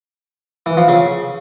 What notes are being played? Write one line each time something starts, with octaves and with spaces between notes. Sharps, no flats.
E3
F3
C#3